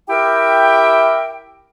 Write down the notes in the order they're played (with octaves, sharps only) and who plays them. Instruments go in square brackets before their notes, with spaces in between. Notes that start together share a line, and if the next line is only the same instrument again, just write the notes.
[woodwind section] E4 G4 A#4 E5 G5